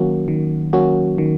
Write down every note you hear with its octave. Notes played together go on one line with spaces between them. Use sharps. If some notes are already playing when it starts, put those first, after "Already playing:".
Already playing: D#3 F#3 A#3 C#4 F#4
D#3
F#3 A#3 C#4 F#4
D#3